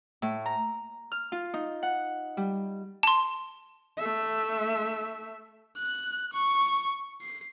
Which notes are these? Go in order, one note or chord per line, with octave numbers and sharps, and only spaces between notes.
A2
A#5
F6
F4
D#4
F#5
G3
A5 C6
A3 E5
F#6
C#6
C7